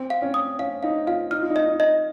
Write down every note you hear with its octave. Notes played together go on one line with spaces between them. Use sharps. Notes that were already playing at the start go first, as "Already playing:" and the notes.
Already playing: C4
F5
C#4
D#6
C#4 F5
D#4 F5
F4 F5
D#4 F6
F4
D#4
D#5
D#4
D#5